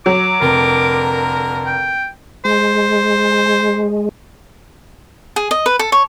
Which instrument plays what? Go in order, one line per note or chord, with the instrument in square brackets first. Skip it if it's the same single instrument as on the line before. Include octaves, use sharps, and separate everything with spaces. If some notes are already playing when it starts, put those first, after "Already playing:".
[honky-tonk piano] F#3 [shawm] D6
[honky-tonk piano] F1 [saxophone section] D3 A#4
[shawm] G5
[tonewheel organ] G#3 [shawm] C5
[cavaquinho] G#4
D#5
B4
A4
C#5